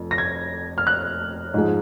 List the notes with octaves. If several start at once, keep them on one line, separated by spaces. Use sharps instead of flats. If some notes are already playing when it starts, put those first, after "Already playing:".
Already playing: F1 F2 F3
A#6
G#6
F6
F#6
G#2 F3 G#3